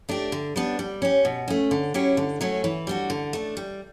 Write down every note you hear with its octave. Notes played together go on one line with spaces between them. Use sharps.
A3 D4 G4
D3
G3 B3 D4
G3
C#4 G4
B2
A3 C#4
D3
F#3 C#4 E4 G4
D3
F#3 A3 C#4
E3
G3 D4 F#4
D3
A3 D4
G3